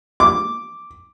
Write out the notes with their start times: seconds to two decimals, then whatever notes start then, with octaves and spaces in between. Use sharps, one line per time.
0.20 D6